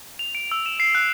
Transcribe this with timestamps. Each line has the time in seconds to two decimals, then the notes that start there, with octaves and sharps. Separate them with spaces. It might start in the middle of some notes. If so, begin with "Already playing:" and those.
0.19 F7
0.35 D7
0.52 E6
0.66 E7
0.80 C7
0.95 F#6